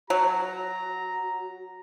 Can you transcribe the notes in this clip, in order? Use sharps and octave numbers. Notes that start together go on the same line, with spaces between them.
F#3 F#4 A#5